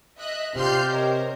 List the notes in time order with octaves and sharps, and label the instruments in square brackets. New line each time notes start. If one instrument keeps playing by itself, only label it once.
[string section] D#5 E5 F#6
[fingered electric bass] C3 [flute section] D4 F4 C5 [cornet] G4 [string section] C6 F6 G6
[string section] A#4 C5 [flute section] C#5 D#5